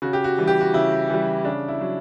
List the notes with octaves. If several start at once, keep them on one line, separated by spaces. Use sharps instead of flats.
C#3 F#4
G4
F#4
E3 G3
G4
F#4
C#3 E4
E3 G3
C#3 D4
E4
F#3